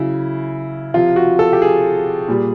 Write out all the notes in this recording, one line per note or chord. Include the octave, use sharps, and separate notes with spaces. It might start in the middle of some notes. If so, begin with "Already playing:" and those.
Already playing: C#3 F#3 E4
C3 F3 F4
F#4
A4
G4
G#4
A#2 G3